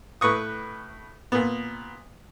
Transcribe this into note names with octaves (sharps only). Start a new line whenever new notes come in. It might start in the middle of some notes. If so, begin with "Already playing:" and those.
A2 B4 C#6 D#6
A#2 B3